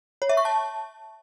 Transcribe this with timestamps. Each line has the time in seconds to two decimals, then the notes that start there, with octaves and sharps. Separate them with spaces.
0.22 C#5
0.29 E5
0.37 C#6
0.45 A5